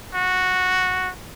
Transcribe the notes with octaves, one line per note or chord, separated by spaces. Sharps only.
F#4